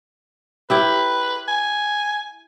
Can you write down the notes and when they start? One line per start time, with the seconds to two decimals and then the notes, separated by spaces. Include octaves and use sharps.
0.70 E4 G4 B4 E5
1.48 G#5